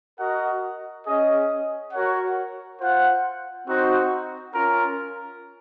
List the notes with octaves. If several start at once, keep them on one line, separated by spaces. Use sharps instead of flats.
F#4 A#4 D#5 F#5
C#4 G#4 D#5
F#4 A#4 C#5 F#5
F4 C5 F#5
C4 D#4 F#4 C5
C#4 F4 A#4